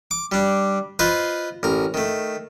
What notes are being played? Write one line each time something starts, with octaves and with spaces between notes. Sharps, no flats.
D6
G3 D4
F4 B4 C5 D#5
A1 A#4
D#3 A3